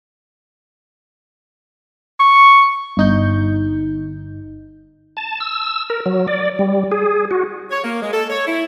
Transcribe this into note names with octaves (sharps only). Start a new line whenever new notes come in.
C#6
G1 D#4 G6
A5
E6
A#4
F#3
D5
G3
G#4
F#4
C#5
A#3
G#3
A4
C#5
E4